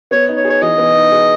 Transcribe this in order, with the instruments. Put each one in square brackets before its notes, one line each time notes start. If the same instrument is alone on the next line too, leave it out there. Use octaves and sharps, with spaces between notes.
[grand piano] B3 [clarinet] C#5
[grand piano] D#4
[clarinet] C#5
[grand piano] G#4
[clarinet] C#5
[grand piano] E3 [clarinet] D#5
[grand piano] B3
D#4
G#4